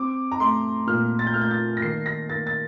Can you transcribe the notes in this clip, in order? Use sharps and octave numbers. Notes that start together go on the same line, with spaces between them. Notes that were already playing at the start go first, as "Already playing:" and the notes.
Already playing: C4 D6
A#5
A3 C6
A#2 F6
A6
G6
A3 F6
G6
A6
A#6
D#3 C7
A#6
A#3 A6
A6